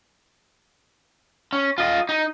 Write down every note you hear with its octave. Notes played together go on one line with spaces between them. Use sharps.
C#4
F4 D#5
D#4